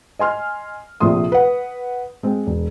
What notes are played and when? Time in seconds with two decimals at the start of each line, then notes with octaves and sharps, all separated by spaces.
0.19 D#5 G#5 C6 F6
1.00 A#1 C3 F3 A3 C6 D#6
1.32 B4 F#5
2.23 G#3 C4
2.47 E1